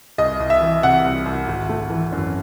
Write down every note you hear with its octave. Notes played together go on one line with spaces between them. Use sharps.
C2 D#5
C2
E5
E3
C3 F#5
C2
C2
G#1
A3
E3
F#2